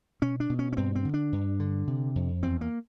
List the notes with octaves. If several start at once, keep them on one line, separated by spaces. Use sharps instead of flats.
B2 C#4
D4
B2
C#4
C#4
G2 C4
C4
D3
D4
G2
D3
C3
F2
E2 C4
A#3